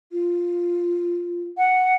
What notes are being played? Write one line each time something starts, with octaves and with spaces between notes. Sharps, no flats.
F4
F#5